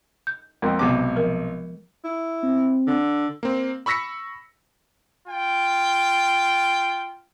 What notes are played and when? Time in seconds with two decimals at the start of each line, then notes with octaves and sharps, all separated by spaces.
0.27 G6
0.62 F2 G#3 A#3 C4
0.79 B1 C3 B3 D6
1.16 F3 A#4
2.05 E4
2.43 C4
2.87 D3
3.43 A#3 C4
3.86 B5 C#6 E6 A#6 B6 C#7
5.28 F4 G5